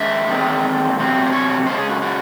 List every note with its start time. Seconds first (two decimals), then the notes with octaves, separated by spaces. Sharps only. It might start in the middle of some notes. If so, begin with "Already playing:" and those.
Already playing: G#2 D#3 G#3 C#4 E5
0.28 E2 D#3 G#3 C4
0.97 E2 C3 F#3 C4
1.26 C5
1.32 C#5
1.66 C#3 G#3 C#4 C5
1.78 G#4
1.89 F#4
2.02 F#4